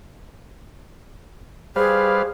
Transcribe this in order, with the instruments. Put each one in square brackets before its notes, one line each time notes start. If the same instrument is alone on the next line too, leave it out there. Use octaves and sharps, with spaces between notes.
[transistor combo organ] G3 B4 F5 [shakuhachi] G#4 [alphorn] C5